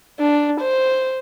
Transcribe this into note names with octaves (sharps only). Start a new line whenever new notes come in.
D4
C5